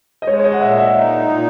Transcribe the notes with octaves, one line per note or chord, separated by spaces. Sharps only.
D#5
G#3 C#5
C#5
D#5
F#5
A#2 E5
F#5
E5
D#4
A#2